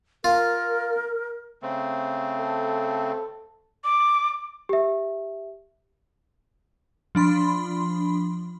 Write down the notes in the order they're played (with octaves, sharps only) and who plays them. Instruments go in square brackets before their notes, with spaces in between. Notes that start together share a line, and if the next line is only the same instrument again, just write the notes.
[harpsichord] F4 [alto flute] A#4
[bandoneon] C#3 A3 C4
[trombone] A4
[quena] D6
[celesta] G4 E5
[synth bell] F3 D4 B5 C6